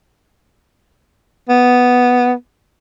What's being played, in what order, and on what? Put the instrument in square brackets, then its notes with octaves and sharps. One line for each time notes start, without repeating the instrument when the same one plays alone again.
[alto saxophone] B3